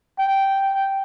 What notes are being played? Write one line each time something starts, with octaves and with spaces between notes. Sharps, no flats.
G5